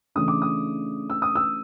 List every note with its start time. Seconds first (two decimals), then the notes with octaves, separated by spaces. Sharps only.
0.15 C#3 E3 A3 D4 D#6
0.28 D6
0.42 D#6
1.10 E6
1.22 D#6
1.35 E6